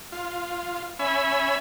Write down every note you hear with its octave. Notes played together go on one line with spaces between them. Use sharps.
F4
C#4 E5 G#5 B5